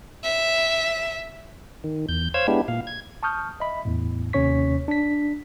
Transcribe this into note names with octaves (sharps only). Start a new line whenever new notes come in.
E5
D#3
E2 G6
C5 C#5 F5 E6 G#6
G#3 B3 D4 E4 G4
A#2 F5
G#6
A5 C#6 D#6 F6 G6
D#5 E5 B5
E2 A2
D#2 C3 C#4 C#5 C#6 B6
D4 B6